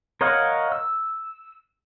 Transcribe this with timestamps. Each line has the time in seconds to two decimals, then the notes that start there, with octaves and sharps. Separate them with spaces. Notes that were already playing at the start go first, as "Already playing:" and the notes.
0.21 A#4 C#5 D#5 F5 F#5
0.72 E6